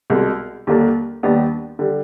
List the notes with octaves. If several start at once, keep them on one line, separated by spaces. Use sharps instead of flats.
C2 B2 G#3
D#2 D3 G3 A#3 D4
D#2 D#3 G3 B3 D4
D3 G3